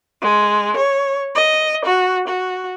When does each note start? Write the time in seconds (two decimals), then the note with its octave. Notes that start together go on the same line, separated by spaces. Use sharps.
0.21 G#3
0.76 C#5
1.34 D#5
1.85 F#4
2.27 F#4